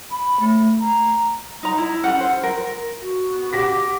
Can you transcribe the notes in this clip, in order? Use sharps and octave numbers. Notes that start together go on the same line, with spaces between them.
B5
A3
A#5
D#4 A#5
E4
C#4 G4 A4 F#5
C5
A#4
F#4
B3
G4 F#5 D6 A#6 B6